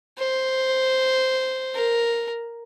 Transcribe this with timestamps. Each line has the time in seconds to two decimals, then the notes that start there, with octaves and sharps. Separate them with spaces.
0.18 C5
1.74 A#4